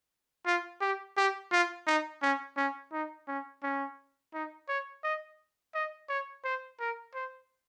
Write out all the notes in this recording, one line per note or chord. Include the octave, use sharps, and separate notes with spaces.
F4
G4
G4
F4
D#4
C#4
C#4
D#4
C#4
C#4
D#4
C#5
D#5
D#5
C#5
C5
A#4
C5